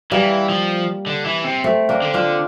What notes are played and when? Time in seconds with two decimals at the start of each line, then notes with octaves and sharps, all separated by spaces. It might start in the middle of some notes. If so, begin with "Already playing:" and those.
0.12 E3 G3 A#3
0.49 F3
1.07 D3
1.26 E3
1.44 C3
1.64 A3 C4
1.89 A#3 D4
2.02 D3
2.14 D4 F4